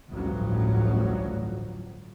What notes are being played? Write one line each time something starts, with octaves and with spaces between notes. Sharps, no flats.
A1 D2 G2 F3 F#3